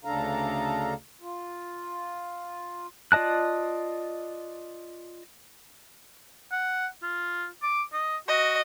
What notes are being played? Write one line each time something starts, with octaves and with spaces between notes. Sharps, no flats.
D2 C#3 D4 A4 F5 A#5
F4
F4 D5 D#5 A5 F#6
F#5
F4
D6
D#5
F#4 D#5